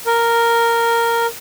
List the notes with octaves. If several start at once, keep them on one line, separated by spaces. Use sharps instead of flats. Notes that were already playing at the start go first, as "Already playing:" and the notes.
A#4